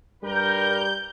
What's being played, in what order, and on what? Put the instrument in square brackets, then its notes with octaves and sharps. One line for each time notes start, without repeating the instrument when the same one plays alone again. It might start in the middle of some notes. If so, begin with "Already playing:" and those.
[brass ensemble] G2 A#4 [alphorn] G3 [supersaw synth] G6